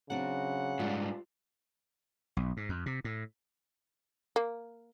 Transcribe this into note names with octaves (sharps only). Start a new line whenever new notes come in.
C#3 F#3 C4 D4 F#5
G#2 G3 F4
B1
G#2
F2
C3
A2
A#3